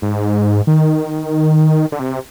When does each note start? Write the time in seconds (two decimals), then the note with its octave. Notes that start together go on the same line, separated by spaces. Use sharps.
0.02 G#2
0.67 D#3
1.92 D3
2.00 C3